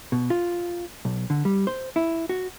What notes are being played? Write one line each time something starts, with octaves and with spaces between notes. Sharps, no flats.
B2
F4
B1
D3
G3
C5
E4
F#4